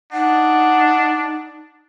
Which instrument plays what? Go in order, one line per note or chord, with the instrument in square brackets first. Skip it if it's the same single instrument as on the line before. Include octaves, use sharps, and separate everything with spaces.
[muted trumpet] D4 [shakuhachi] D#4 [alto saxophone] F#5